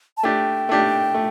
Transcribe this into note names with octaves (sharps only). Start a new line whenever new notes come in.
A5
A3 D4 G4 G5
A3 D4 G4
A3